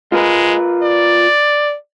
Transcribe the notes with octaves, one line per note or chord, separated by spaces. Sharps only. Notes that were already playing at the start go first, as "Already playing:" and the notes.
G#3 F4 A#4 B4
D5